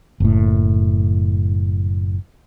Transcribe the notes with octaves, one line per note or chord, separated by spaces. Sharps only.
F#1 A2